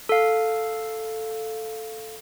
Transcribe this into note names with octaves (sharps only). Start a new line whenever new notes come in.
A4 F5